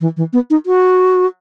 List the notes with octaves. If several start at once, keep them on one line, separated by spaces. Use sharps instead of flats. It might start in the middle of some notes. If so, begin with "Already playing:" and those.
E3
E3
B3
D#4
F#4